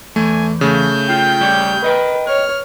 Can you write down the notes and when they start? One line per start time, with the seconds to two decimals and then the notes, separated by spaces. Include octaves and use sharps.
0.16 E2 A3 G#5
0.61 C#3 A3 G6
1.10 F4 G5
1.41 G3 G4 C#5
1.84 B4 D#5 G5
2.27 C#5 F6